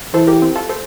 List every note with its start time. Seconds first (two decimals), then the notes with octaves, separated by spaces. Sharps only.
0.14 E3 A4 C5
0.27 G4 A#4
0.42 C4
0.56 F4 A4
0.69 A4 C5